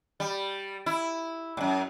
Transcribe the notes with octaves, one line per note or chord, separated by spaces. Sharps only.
G3
E4
F#2 A2